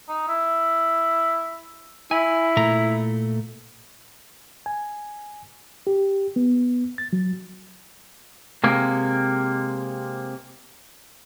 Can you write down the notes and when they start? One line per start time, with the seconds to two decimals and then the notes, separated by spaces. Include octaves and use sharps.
0.09 D#4
0.28 E4
2.11 E4 G#5
2.57 A#2 A3 A#5
4.66 G#5
5.87 G4
6.36 B3
6.98 A6
7.13 F#3
8.64 C3 G#3 A#3